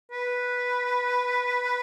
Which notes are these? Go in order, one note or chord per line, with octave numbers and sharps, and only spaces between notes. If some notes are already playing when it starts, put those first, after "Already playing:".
B4